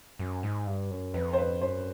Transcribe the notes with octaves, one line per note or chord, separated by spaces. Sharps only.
F#2
G#2
G2
F#2
F2 B4
C5
B4
F#2 C5